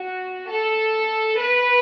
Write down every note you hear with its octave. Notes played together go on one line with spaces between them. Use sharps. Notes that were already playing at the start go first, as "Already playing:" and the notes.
Already playing: F#4
A4
B4